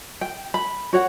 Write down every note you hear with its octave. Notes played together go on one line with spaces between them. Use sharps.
G5
B5
F#4 C#5 F#5